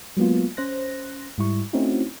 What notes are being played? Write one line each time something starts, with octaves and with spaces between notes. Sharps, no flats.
F#3 G#3 A#3 B3 F4
C#4 C5 F#6 A#6
G#2 G3 E4 C#6
A3 C4 C#4 D#4 E4 F#4